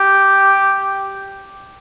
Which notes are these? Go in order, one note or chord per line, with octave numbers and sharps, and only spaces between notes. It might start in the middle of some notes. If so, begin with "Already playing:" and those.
Already playing: G4